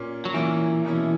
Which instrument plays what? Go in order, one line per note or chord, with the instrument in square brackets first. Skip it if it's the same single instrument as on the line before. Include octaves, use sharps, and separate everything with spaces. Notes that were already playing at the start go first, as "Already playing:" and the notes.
Already playing: [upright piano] A#2 A#3 C#4
[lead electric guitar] F#3
[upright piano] A#2 A#3 C#4 [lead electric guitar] E3
[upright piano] B2 A#3 C#4 E4